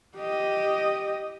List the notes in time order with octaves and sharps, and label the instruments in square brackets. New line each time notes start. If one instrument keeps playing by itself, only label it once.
[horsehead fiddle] G4 D#5